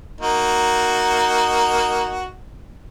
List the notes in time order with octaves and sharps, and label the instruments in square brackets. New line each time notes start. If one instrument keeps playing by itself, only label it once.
[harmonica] A#3 D#4 F#4